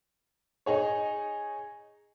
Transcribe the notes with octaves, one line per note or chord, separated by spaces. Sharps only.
D#4 G#4 C#5